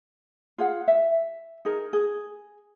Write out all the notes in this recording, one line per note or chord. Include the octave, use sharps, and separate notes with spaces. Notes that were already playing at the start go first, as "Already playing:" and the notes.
F4 G#4 F5 F#5
E5
D#4 G#4 A#4
G#4